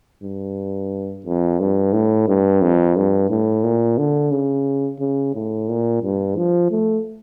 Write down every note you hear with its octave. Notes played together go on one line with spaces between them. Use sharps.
G2
F2
G2
A2
G2
F2
G2
A2
A#2
D3
C#3
C#3
A2
A#2
G2
F3
A3